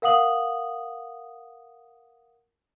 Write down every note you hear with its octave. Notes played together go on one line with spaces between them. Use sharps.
A#4 F5 F#5 D#6 F#7